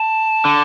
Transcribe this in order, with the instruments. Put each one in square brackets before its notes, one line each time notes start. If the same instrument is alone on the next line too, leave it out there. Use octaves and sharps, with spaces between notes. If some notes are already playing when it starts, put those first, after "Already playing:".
Already playing: [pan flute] A5
[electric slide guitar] D3